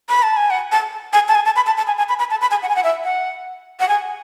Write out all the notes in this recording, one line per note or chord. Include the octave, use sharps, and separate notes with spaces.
B5
A5
G#5
F#5
A5
G#5
A5
G#5
A5
B5
A5
A5
G#5
G#5
B5
B5
A5
B5
G#5
F#5
G#5
F#5
E5
F#5
F#5
G#5